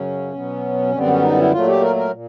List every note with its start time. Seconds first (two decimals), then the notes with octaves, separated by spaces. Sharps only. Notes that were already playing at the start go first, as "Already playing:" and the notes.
Already playing: F#2 C#3 F#3 C#4
0.34 B2 F#3 B3
0.92 F#2 D3 G3 B3 C4
1.08 C#4
1.22 D#4
1.37 E4
1.51 A#2 F#3 A3 F4
1.67 G4
1.82 A#4
1.96 A#4
2.11 A#2